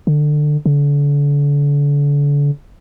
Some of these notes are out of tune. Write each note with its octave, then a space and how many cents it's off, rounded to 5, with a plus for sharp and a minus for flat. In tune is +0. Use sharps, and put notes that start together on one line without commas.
D3 +20
D3 -35